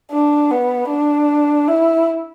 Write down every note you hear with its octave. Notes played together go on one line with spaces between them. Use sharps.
D4
B3
D4
E4